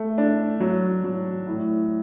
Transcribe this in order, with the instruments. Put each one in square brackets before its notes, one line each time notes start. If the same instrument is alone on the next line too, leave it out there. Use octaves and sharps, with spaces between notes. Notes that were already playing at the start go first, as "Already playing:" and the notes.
Already playing: [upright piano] A3
D4
F#3
F#3
A2